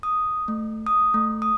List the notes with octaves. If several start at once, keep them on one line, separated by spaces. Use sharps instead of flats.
D#6
A3
D#6
A3
D#6